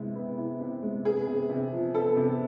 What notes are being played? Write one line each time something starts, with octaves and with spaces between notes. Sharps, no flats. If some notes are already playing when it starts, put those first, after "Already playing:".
Already playing: C3 G#3 B3 E4
B3
E4
C3
G#3
B3 G#4
C3
C3
F3
B3 A4
C3